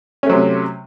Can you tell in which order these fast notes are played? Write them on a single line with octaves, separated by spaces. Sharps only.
C#4 A3 F#3 C3